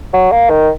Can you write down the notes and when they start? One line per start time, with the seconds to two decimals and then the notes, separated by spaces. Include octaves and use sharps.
0.13 F#3
0.32 A#3
0.50 D#3